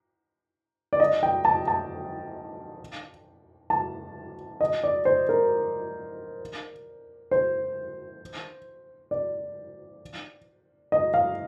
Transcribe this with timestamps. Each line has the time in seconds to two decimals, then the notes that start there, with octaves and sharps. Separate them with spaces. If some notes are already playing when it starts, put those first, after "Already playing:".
0.93 D5
1.00 D#5
1.23 G5
1.45 A5
1.67 A5
3.70 A5
4.61 D#5
4.84 D5
5.05 C5
5.29 A#4
7.31 C5
9.11 D5
10.92 D#5
11.14 F5